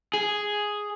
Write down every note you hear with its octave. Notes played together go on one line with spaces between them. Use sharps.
G#4